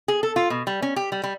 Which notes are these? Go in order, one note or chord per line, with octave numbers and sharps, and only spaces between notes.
G#4
A4
F4
B2
G3
C#4
G4
G3
G3